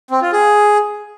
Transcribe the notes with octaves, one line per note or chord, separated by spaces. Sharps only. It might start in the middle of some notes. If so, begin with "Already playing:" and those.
C4
F4
G#4